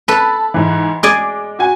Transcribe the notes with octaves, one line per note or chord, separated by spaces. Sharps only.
A4 B4 A5 B5
G#2 E3
G#3 G#4 D5 G#5 D6
F#4 G#5